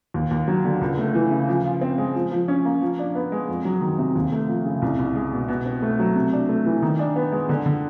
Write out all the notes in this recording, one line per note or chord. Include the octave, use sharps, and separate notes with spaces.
D#2
D#2
F#3
D3
C#2
A3
E3
C#3
F3
F4
C4
G#3
F3
F3
C#4
A#3
F3
D4
B3
G#3
F2
F#3
D#3
C3
D#2
A3
F3
C#3
C2
C2
G#3
B2
B2
C4
A3
F#3
C3
D4
A3
E3
D#3
D4
B3
G#3
D3
D3